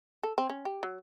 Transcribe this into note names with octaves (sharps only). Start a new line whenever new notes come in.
A4
C4
C#4
G4
F#3